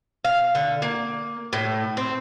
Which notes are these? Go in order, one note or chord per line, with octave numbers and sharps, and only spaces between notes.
F5
D3
A#3
A2
C4